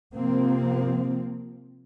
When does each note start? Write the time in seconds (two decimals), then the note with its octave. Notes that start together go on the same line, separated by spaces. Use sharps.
0.14 C3 F3 A#3 C4